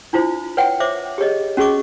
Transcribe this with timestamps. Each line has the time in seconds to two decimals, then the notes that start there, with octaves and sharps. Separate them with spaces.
0.13 D4 E4 F4 C5
0.57 B4 C#5 F#5 G5
0.80 C5 C#5 E5 D6
1.18 G4 G#4 C#5 D#5
1.57 C#4 F#4 G#4 D#5 C#6 D6